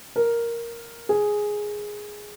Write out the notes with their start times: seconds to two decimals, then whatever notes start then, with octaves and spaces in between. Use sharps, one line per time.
0.16 A#4
1.09 G#4